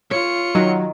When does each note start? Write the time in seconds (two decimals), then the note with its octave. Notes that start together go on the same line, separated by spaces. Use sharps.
0.11 F4 C#5 C#7
0.55 D#3 F#3